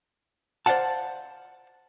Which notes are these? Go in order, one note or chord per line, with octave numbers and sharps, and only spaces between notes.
C5 D5 F5 F#5 A5